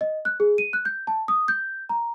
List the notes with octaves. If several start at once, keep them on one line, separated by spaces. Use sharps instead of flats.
D#5
F#6
G#4
D#7
F#6
G6
A5
D#6
G6
A#5